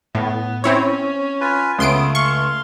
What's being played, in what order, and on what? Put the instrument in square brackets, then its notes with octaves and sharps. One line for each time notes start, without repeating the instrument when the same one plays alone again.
[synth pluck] A2 [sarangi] B3
[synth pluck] C4 E4 C#5 [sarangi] C#4
[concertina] F4 B4 G#5
[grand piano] C#2 [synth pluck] C#3 C6 D7 [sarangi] A3 [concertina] B3 D#6
[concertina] F5 C6 [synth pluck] C#6